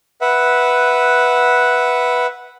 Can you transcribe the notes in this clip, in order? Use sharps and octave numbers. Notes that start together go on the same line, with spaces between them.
B4 E5 F#5